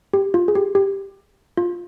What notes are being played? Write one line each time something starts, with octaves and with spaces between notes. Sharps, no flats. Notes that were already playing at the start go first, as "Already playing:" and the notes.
G4
F4
G#4
G4
G4
F4